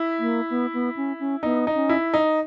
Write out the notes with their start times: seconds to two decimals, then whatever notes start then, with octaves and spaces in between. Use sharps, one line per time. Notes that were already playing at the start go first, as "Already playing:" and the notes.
Already playing: E4
0.19 A#3
0.50 B3
0.73 B3
0.96 C#4
1.20 C#4
1.43 B3 D#4
1.67 D#4
1.75 C#4
1.89 E4
2.14 D#4